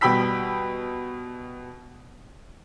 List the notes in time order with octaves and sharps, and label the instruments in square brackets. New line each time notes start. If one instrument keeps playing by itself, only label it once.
[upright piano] B2 G3 G5 B5 E6 B6